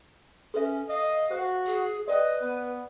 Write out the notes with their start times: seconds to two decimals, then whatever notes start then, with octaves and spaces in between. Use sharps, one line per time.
0.54 C#4 A4 B4 E5
0.89 D#5 F5
1.31 F#4 C5
1.66 G#4
2.08 B4 D5 D#5 F#5 G5
2.42 B3